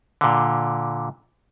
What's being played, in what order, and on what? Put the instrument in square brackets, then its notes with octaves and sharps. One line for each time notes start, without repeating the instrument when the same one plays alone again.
[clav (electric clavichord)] A#2 D3